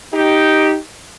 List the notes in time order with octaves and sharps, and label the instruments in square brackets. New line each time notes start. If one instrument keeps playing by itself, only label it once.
[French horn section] D#4 G4